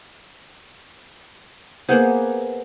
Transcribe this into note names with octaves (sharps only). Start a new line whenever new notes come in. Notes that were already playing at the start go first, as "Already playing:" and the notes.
A#3 B3 G#4 C5 F#5 G6